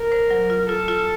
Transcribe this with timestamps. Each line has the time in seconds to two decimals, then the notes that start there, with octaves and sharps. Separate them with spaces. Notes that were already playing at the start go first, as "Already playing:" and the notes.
Already playing: A#4
0.12 C5
0.31 F#3
0.50 F4
0.69 F4 A4
0.88 F4